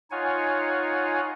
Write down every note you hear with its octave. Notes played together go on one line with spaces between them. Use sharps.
D#4 F4 C#5 F#5 G#5